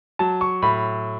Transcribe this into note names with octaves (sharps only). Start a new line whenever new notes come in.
F#3 A5
C#6
A2 B5